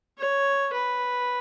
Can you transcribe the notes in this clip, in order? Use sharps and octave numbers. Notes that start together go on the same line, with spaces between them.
C#5
B4